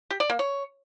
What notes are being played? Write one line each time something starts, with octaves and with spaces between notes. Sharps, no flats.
G4
D5
A#3
C#5